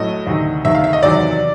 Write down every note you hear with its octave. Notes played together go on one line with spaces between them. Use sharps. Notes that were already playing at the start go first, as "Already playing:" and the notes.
Already playing: A2 F#3 D#5
D2 C3 D#3
D2 C3 D#3 E5
F5
E5
D#5
E2 C3 D#3 F#3 D5